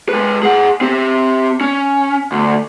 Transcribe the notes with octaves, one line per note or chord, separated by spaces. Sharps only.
G#3 B4
G#4 F#5
C4 G4
C#4
D2